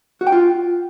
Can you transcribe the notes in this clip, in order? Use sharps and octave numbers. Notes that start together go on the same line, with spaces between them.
F#4
G5
F4